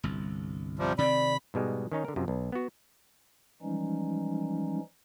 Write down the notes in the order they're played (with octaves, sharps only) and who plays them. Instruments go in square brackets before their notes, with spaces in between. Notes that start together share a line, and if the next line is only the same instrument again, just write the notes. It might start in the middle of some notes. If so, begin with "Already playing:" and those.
[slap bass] G1 C2
[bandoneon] C3 F3 G3
[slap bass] C3 D#3 C4 [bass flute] D5 [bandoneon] B5
[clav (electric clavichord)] G#2 B2 G3 G#3
D#3 C#4 D#4 C#5
D3 A#4
F#2 C3 F3
B1
B3 F#4
[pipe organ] E3 F3 G3 G#3 C#4 D#4